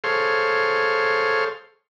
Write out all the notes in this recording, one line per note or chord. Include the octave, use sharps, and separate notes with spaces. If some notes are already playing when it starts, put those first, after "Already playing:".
G#4 A4 C5 C#5 F5 C6